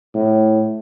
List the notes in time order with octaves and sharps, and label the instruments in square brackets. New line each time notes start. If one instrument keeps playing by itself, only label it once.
[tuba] A2